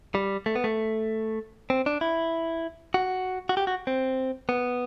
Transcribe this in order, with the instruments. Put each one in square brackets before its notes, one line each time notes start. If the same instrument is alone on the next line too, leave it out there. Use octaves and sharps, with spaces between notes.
[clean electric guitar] G3
A3
B3
A3
C4
D4
E4
F#4
F#4
G4
F#4
C4
B3